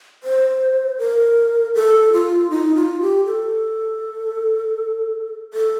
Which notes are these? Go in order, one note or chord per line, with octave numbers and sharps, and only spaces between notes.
C5
A#4
A4
F4
D#4
F4
G4
A4
A4